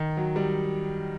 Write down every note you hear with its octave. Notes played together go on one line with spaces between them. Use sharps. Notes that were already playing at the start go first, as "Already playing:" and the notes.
Already playing: D#3
F#3
G3